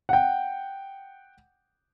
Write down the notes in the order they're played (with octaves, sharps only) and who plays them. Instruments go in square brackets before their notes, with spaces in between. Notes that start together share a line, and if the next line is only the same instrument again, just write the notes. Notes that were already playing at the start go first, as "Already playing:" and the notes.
[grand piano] F#5 G5